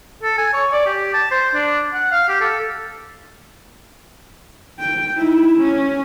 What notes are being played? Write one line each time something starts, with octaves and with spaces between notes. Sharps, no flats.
A4
G#5
C#5
D5
G4
A5
C5
D4
F#5
F5
G4
A4
G5
D#4 E4
C#4